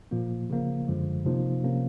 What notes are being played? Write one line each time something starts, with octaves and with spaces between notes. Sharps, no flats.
A#2 F3 A#3
C#3 F3 A#3
F#2 D3 F3 G#3
C3 F3 A#3 D#4
C3 F3 A#3 C#4